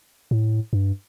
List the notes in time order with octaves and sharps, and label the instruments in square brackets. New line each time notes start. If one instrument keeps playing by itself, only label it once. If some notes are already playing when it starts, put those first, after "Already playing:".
[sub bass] A2
G2